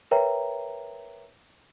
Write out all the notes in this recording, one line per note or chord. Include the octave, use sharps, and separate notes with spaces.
A#4 B4 C#5 E5 G5 A#5